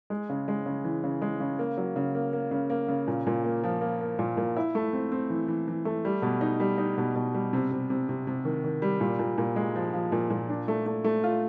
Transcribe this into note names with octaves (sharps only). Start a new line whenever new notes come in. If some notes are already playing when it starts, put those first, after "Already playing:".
G#3
C#3
G#3
C#3
E3
C#3
G#3
C#3
A#3
F#3
C#3
A#3
A#3
C#3
A#3
C#3
A#2
A#2
A#3
F3
A#3
A#3
A#2
A#2
E4
A3
C4
C4
E3
E3
E3
A3
G3
B2
D#4
G3
D#4
B2
B2
G3
C3
C3
C3
C3
C3
D#3
D#3
G3
A#2
A#2
A#2
G#3
F3
F3
A#2
A#2
D4
A3
A3
A3
F4